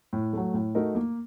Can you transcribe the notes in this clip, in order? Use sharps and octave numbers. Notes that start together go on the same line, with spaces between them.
A2
F#3 A3
A2
A3 D#4 F#4 A#4
A#3